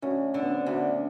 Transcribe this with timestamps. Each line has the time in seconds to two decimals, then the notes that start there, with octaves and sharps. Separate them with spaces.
0.02 D2 C#4
0.34 D3
0.43 B3
0.51 C4
0.66 D2